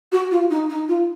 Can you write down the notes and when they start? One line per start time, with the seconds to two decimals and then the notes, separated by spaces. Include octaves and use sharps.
0.12 F#4
0.31 F4
0.50 D#4
0.69 D#4
0.88 F4